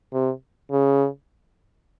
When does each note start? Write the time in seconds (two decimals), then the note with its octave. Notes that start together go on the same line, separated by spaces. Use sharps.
0.13 C3
0.72 C#3